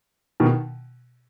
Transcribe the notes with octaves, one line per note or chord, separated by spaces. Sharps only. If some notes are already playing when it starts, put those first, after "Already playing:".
B2 D#3